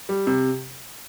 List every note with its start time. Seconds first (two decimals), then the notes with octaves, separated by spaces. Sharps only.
0.09 G3
0.27 C3